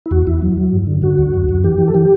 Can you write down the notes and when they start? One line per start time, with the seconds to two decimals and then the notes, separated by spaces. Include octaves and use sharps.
0.06 E4
0.11 E2 F#4
0.27 E2 E4
0.42 F#3
0.58 F#3
0.73 G2
0.87 D3
1.02 D3 F#4
1.18 D2
1.34 F#2
1.49 F#2
1.64 E3 G4
1.78 E3
1.88 A4
1.94 E3 G4